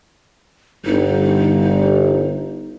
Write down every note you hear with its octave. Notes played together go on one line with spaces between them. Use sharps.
G1 D#4